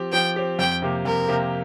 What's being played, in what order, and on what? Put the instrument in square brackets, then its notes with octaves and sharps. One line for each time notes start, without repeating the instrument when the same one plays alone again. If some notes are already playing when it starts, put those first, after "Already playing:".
Already playing: [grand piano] F3 C4 G4
[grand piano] F3 [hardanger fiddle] G5
[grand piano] C4 G4
[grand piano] F2 [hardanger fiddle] G5
[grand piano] C3 A#3 G4
[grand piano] F2 [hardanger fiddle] A#4
[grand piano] C3 A#3 G4